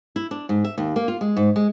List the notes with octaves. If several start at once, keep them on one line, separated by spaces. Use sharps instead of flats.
E4
D4
G#2
E5
D#2
A#3
F4
G#3
G#2
G#3